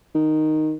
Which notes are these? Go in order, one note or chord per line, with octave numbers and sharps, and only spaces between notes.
D#3